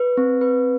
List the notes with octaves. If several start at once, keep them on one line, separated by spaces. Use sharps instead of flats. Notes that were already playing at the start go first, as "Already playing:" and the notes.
Already playing: B4
C4
B4